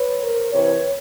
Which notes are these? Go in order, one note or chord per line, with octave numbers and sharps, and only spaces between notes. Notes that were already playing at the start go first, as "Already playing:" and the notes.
Already playing: B4 C#5
A#4 C5
C3 E3 B4 C#5